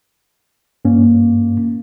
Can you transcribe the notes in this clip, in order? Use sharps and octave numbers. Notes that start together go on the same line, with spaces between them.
G2 A#3 C#4